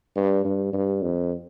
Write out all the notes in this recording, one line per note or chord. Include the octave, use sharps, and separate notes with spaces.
G2
G2
G2
F2